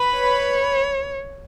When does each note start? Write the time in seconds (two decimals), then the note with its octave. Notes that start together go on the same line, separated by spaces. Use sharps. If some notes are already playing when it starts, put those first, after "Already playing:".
Already playing: B4 B5
0.17 C#5